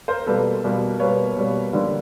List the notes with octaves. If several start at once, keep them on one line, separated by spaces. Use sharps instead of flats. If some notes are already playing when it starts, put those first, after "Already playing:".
A#4 C5
B2 G3 A#3 A4 B4
B2 G3 A#3
B2 G3 A#3 B4 C#5
B2 G3 A#3
D3 G3 A#3